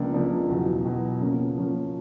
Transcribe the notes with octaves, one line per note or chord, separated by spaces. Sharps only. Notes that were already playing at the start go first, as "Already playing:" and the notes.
Already playing: C#2 C#3 F3 A#3 D4
C#2 C#3 F3 A#3 D4
E2 B2 F#3
E2 B2 F#3
C#3 F3 A#3 C#4
C#3 F3 A#3 C#4